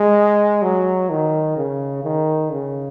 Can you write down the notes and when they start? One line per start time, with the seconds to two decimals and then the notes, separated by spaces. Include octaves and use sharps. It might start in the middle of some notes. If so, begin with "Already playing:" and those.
Already playing: G#3
0.62 F#3
1.10 D#3
1.57 C#3
2.04 D#3
2.52 C#3